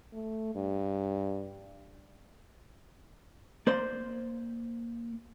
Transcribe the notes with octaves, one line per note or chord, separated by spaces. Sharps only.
A3
G2
A#3 C5 D5 C6